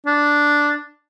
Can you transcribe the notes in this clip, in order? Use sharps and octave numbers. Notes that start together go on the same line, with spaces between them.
D4